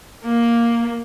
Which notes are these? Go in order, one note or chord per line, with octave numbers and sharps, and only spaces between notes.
A#3